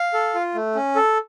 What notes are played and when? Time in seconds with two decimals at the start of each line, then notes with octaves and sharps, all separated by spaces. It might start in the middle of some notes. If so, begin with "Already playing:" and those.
Already playing: F5
0.14 A4
0.34 F4
0.55 A3
0.75 C#4
0.96 A4